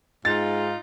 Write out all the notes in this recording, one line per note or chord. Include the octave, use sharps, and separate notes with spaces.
G#2 D#4 F4 A6